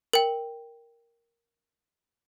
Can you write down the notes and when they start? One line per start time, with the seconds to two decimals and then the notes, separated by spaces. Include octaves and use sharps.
0.13 A#4 G5